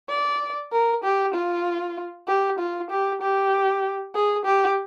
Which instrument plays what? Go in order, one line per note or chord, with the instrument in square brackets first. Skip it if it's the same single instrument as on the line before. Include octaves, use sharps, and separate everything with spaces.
[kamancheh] D5
A#4
G4
F4
G4
F4
G4
G4
G#4
G4